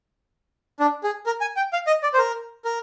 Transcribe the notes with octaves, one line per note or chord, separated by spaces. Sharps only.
D4
G#4
A#4
G#5
G5
F5
D#5
D5
C5
A#4
A#4